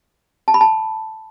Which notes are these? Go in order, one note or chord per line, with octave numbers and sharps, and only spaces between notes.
A5
B5
A5